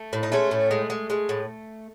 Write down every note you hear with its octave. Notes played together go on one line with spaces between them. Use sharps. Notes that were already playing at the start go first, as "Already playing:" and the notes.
Already playing: A3
A2
D#4
G#3 A3 C#4
A2
G#3
G#3
G#3
A2